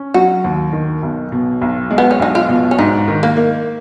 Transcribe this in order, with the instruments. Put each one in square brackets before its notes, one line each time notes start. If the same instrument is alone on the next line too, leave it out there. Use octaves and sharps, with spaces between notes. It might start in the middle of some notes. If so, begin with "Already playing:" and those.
Already playing: [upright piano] C#4
[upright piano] F#3 [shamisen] F#4
[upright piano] D#2
D#3
B1
B2
B1
G#3
[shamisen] B3
C#4
[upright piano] B1 [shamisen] D#4
[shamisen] F4
[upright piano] B2
[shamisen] C#4
[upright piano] G#2 [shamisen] D#4
[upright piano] D#3
[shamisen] A#3
[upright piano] A#3